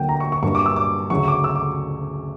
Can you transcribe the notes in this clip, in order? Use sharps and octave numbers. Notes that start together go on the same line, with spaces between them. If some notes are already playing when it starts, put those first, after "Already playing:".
Already playing: D2 D3 F#3 A#3 F#5 G5
A#5
C#6
C#6
G2 F#3 A#3 C#6
D6
E6
D6
D2 C#3 F#3 C#6
D6
E6
D6